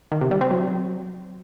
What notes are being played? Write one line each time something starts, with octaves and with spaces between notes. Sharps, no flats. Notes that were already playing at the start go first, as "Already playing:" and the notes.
D#3
C3
G3
C4
F#3